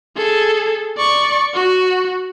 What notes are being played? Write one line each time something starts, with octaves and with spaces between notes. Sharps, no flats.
G#4 A4
D5 C#6
F#4